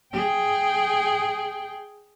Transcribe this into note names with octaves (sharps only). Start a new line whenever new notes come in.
G#4 G5